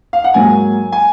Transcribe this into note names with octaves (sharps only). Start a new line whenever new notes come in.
F5
F#5
G#2 F#3 A#3 G#5
G#5